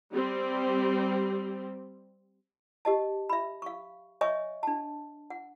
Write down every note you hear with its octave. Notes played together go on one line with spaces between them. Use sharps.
G3 C4
G4 D#5 A5
E5 B5
F5 C#6
C#5 D#5 E5 G#5 C#6
D4 A5
F#5